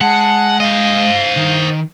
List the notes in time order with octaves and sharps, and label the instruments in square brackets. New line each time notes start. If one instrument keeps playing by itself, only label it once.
[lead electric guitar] G#3 [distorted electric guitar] F#5 [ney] A5
[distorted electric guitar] C5 D#5 [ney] F5
[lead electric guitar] D#3